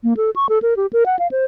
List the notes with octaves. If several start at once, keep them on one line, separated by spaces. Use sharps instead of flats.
A#3
A4
C#6
A4
A#4
G4
A#4
F#5
F5
C5